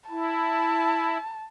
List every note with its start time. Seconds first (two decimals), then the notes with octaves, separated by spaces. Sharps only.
0.10 E4 A5